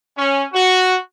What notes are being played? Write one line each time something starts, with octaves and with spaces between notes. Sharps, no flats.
C#4
F#4